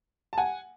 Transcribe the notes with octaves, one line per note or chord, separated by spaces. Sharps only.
A5
F#5 G#5